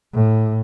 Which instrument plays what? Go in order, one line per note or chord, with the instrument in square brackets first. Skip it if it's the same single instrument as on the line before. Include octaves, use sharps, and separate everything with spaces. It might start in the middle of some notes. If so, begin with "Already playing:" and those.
[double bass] A2